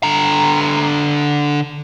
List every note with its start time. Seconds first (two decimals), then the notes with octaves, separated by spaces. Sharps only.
0.03 D3 A#5